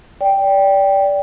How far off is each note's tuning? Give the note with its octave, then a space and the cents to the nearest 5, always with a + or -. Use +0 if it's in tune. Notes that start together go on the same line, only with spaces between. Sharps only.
D5 -20 G5 +0